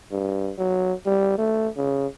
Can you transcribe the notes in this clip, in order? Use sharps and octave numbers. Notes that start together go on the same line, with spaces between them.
G2
F#3
G3
A3
C#3